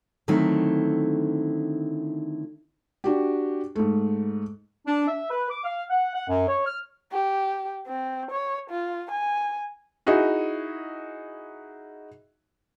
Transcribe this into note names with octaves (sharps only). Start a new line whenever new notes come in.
D3 D#3 F#3 A3 C4 E4
D4 F#4 G4
G#2 A3
D4
E5
B4
D6
F5
F#5
F#5
F#2
C#5
F6
G4
C4
C#5
F4
G#5
D#4 E4 F#4 G#4